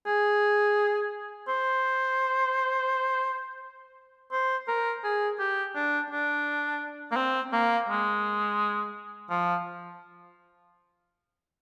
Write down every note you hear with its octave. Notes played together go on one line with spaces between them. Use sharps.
G#4
C5
C5
A#4
G#4
G4
D4
D4
A#3
C4
A#3
G#3
F3